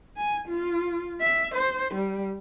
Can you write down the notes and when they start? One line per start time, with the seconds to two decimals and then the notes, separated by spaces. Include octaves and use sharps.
0.17 G#5
0.48 F4
1.21 E5
1.54 C5
1.94 G3